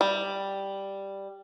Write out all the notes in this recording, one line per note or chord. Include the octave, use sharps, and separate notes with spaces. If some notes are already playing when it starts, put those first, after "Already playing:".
G3